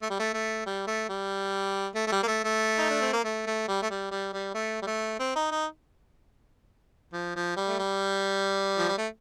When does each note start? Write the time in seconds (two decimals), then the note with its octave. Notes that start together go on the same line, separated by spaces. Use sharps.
0.02 A3
0.10 G3
0.20 A3
0.34 A3
0.66 G3
0.87 A3
1.09 G3
1.95 A3
2.07 A3
2.12 G3
2.23 A#3
2.28 A3
2.44 A3
2.78 D#4
2.90 D4
3.01 C4
3.13 A#3
3.25 A3
3.47 A3
3.69 G3
3.83 A3
3.90 G3
4.11 G3
4.33 G3
4.54 A3
4.82 G3
4.87 A3
5.19 C4
5.36 D#4
5.51 D#4
7.13 F3
7.36 F3
7.57 G3
7.68 A3
7.79 G3
8.78 F3
8.88 G3
8.98 A3